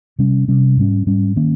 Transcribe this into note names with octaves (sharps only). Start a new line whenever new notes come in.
C3 G3 C#4
C3 G3 C#4
G#2 G3 C#4
G#2 G3 C#4
D#3 A#3 C#4